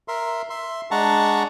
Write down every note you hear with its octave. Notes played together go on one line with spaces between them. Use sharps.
A#4 E5 C6
E5 C6
G#3 D4 F#5 A5 A#5 C#6